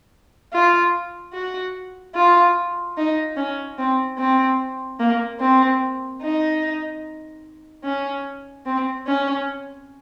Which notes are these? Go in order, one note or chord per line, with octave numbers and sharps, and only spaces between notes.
F4
F#4
F4
D#4
C#4
C4
C4
A#3
C4
D#4
C#4
C4
C#4